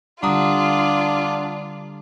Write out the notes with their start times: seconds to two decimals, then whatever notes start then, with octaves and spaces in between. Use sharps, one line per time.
0.23 D3 G3 D4 F4 F#5 A#5 D#6